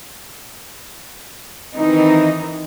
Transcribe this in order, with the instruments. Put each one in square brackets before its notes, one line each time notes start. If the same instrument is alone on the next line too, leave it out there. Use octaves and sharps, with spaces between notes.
[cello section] D#3 E3 C4 D#4